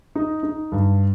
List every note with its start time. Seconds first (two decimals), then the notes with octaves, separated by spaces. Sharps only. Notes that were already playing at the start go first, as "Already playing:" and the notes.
0.15 D#4
0.43 D#4
0.72 G2